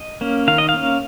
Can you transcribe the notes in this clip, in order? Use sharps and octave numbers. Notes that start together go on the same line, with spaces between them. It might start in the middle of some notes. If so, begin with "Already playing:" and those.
Already playing: D#5
A#3 C#4
D#3 F5
D#5
F5
A#3 C#4